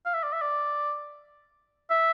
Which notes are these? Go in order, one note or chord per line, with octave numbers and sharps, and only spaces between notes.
F5
E5
D5
E5
D5
E5